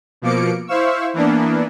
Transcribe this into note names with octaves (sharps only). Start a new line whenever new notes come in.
B2 F3 A#3 D6 C#7 D7
E4 C5 F5 C#6 E6
E3 A#3 B3 D4